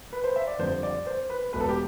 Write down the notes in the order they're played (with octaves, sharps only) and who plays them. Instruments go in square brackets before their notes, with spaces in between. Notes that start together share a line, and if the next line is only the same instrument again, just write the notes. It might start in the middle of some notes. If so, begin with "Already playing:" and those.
[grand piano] B4
C5
E5
D5
F2 D3 G3 C4 C5
D5
C5
B4
E1 E2 B2 A3 B4
A4
G4